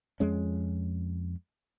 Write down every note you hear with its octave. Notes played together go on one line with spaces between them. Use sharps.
F2 G#3 C#4